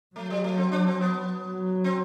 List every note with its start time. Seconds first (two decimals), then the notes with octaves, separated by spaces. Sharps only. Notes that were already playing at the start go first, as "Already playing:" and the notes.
0.16 F#3 A3
0.30 G3
0.44 A3
0.58 C4
0.72 D4
0.87 C4
1.01 B3
1.42 F#3
1.84 C4